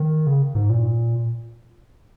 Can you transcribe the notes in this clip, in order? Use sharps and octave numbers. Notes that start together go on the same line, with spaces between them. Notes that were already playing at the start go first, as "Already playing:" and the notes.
Already playing: D#3
C#3
G#2
A#2